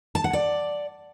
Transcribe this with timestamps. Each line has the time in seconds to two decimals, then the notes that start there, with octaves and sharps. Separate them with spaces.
0.15 A5
0.24 F#5
0.33 D5